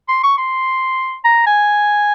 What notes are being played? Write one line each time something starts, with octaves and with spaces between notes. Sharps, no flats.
C6
C#6
C6
A#5
G#5